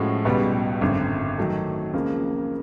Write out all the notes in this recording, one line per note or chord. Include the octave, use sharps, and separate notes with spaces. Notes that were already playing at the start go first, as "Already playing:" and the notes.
Already playing: A2 F3 G#3 C#4 F#4
C#2 B2 G3 B3
G#1 F#2 D3
D#3 F#3 A3
C#2 C#3 F3 A#3